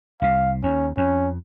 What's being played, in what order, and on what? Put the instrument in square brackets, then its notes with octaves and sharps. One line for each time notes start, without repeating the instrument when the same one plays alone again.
[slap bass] C2 C3 [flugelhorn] F5
[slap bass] D#2 [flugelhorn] C#4
[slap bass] F2 [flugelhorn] C#4